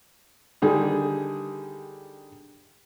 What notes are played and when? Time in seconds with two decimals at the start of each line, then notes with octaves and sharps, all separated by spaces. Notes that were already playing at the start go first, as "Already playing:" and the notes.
0.62 D3 D#3 G3 G#4